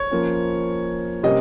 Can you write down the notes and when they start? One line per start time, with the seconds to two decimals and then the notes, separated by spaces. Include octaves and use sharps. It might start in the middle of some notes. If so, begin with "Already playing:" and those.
Already playing: C#5
0.11 F3 A#3 C#4
1.23 C3 G3 A#3 C#4 D#5